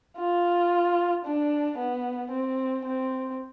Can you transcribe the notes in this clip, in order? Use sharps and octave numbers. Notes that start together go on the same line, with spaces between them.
F4
D4
B3
C4
C4